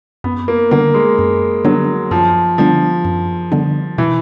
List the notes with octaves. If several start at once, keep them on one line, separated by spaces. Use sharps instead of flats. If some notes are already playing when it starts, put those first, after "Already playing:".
F#2 B3
A#3
D3 G3 A#3 B3 D4
G#3
F#2
D3 F#3 G3 B3 D4
F#2 F3
D3 F3 G3 B3 D4
F#2
D3 G3 B3 D4
B2 E3